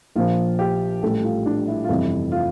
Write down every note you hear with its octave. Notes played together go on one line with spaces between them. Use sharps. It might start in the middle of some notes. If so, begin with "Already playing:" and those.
A#1 A#2 F3 F4
G4
A1 A2 G3 A4
F4
D4
E4
F4
G1 F2 C3 E3 E4
F4